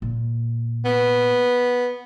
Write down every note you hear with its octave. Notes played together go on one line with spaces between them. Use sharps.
A#2
B3